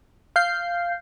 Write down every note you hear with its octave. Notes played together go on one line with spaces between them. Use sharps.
F5 G6 C7